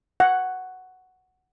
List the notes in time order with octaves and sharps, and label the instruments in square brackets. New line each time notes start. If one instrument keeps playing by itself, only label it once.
[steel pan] F#5